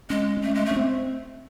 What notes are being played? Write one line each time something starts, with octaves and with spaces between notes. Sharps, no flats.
G#3 C#4
C#4
A3
G#3
A3
C#4
C4